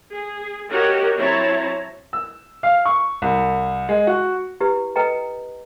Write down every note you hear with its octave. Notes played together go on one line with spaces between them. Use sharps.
G#4
F#4 G4 A#4 C#5 D#5
F#3 C4 E4 C#5 A5 A#5
E6
F5
C#6
C2
G#3
F#4
E4 G4 B4
A4 B4 D#5 G5 A#5